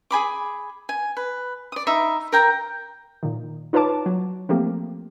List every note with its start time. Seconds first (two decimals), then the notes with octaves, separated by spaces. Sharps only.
0.11 G#4 G#5 B5 D6
0.89 G#5
1.17 B4
1.72 D5 D#6
1.87 D#4 E5 B5
2.32 A#4 G5 A#5
3.23 A#2 D#3
3.73 D#4 F4 B4 C#5 A5 D6
4.06 F#3
4.49 F3 A3 A#3 C4 G4